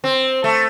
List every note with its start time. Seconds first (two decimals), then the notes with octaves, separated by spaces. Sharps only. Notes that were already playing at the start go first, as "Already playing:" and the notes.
0.04 C4
0.44 A3